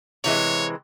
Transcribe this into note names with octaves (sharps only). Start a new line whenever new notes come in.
C3 E3 G#3 C#5